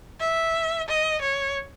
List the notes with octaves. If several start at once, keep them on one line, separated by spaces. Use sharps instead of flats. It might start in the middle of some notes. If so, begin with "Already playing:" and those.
E5
D#5
C#5